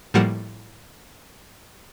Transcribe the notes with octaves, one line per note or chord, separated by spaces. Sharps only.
A2 F3 G3 A#3 F#5 E7